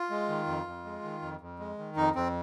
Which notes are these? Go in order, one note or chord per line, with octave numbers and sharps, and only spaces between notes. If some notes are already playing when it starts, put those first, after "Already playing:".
Already playing: F4
G#3
D#3
F2
F2
G#3
D#3
F2
F2
G#3
D#3
F2 D#4
F2 C4